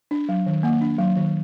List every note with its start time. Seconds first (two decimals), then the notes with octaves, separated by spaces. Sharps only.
0.11 D4
0.29 F#3
0.46 D#3
0.63 A#3 F#5
0.81 D4
0.99 F#3
1.17 D#3